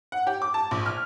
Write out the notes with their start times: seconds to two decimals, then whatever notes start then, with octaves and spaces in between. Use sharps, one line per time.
0.12 F#5
0.27 G4
0.42 D6
0.54 A5
0.71 A#1
0.86 F6